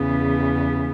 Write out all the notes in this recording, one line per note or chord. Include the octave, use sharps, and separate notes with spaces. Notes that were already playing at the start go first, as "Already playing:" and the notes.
Already playing: E2 C#3 E3 B3